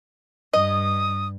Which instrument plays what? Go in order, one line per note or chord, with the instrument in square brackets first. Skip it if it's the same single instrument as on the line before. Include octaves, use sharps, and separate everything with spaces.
[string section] G2 [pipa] D#5 [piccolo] D#6